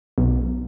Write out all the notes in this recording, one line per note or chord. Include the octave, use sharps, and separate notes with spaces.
B1